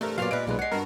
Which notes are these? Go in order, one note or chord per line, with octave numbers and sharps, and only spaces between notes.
G2 C3 E3 A3 A#4
A#2 F#3 B3 F4 C5 D5 F5 F6
A#2 G#3 B4 D5 D7
B1 G#3 A#3 B3 B4
G#3 C#5 F#5 C7
G2 F#4 A#4